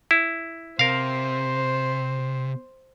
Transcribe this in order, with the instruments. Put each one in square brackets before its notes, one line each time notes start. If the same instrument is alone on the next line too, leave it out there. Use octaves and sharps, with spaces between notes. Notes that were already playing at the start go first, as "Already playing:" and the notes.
[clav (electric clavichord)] E4
[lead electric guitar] C3 [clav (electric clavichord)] A#4 F5 [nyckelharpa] C5